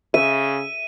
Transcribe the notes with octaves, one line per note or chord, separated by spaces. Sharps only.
C#3 E5 D#7